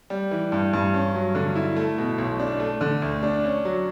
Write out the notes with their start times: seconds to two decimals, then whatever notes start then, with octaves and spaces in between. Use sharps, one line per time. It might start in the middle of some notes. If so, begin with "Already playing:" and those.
0.10 G3
0.31 E3
0.52 G2
0.73 G2
0.94 C#4
1.15 F#3
1.35 D3
1.56 E4
1.76 A3
1.98 B2
2.18 B1
2.40 D4
2.60 A3
2.81 D3
3.02 D2
3.23 D4
3.44 C#4
3.65 F#3